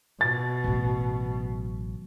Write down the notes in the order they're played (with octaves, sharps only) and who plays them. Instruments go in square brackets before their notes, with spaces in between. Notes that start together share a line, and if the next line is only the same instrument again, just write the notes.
[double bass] B2 [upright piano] A6
[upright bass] A1 F#3